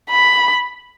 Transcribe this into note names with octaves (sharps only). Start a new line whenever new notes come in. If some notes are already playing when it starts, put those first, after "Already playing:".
B5